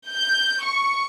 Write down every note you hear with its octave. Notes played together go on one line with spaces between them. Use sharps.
G6
C#6